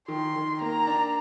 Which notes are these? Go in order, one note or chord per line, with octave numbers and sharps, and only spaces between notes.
D#3 C6
D#3
A#3 A#5
D4